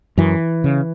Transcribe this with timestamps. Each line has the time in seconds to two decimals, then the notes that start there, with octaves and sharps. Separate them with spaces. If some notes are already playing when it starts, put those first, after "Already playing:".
0.17 F#2 E3
0.64 C#3